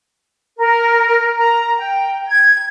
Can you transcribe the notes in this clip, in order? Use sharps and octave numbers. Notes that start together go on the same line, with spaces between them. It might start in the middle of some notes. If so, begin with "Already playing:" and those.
A#4
A#5
G5
G#6